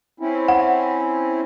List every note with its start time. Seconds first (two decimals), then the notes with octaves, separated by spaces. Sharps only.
0.20 C4 C#4 E4
0.48 F#5